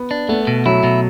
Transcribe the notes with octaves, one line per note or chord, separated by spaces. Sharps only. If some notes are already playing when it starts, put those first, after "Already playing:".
Already playing: B3
D4
A3 B3
B2
F#3 E4
B2